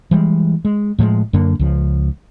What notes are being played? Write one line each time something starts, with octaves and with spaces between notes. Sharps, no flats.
E3 G3 G#3
G#3
A2 F3 F#3 G#3
F#2 D3 A#3
C#2 F3